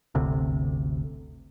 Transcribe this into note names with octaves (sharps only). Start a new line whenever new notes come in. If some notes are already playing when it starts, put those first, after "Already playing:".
G1 D2 C3